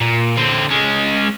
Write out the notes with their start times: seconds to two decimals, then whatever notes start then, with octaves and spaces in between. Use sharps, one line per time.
0.01 A#2
0.37 D3 C4
0.70 G#3 C#4